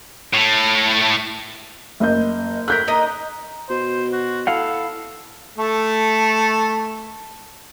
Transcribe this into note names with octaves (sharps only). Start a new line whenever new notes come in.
A2 A3
F#1 D#5 G6
A3 A#4 F#6 G6 B6
A#3 D#4 D#5
B2 C5
F#4
E4 A4 F5 F#5
A3 A4